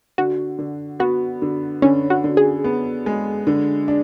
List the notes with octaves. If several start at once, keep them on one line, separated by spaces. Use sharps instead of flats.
D3 F#4
D3
B3 F#4
D3
D3 C#4
F#4
D3
G#4
B3
G#3
D3
D4